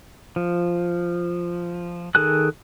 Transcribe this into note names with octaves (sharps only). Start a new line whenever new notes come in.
F3
D#3 G#4 A4 G#5 F#6